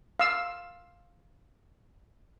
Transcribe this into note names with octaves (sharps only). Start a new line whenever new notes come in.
F5 E6